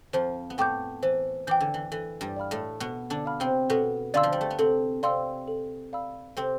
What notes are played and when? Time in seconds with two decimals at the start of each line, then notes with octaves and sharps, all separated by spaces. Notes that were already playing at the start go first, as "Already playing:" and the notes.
0.13 F2 F3 C5
0.50 B3
0.58 A2 A3 G5 D6 G6
1.03 E3 C5
1.47 E3 G5 D6 G6
1.61 D3
1.74 E3
1.92 E3 A4
2.21 G2 G3
2.36 D5 F5 B5 F6
2.51 A2 A3
2.80 B2 B3 A4
3.10 D3 D4
3.25 D5 F5 B5 F6
3.40 C3 C4
3.70 B2 B3 A4
4.14 D3 D4 D5 F5 C6 E6
4.23 F3
4.33 G3
4.41 A3
4.51 B3
4.59 C3 C4 A4
5.03 C3 C4 D5 F5 C6 E6
5.48 A4
5.93 D5 F5 B5 E6
6.37 C3 C4 A4